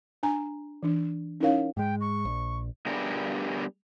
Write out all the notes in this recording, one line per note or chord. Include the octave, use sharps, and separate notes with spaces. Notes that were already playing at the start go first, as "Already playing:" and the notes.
D4 G#5 A#5
E3 D4
C#4 D#4 E4 A#4 C#5 F5
G#2 G#3 G5
C#6
A#1
G3 B3 D4 G4 G#4 A#4